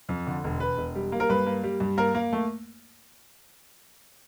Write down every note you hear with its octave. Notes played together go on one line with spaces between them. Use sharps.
F2
D3
E1
E1 B4
E1
G3
A#3
A#4
G2 B4
A#3
G3
G2
A#3 A#4
A#3
A3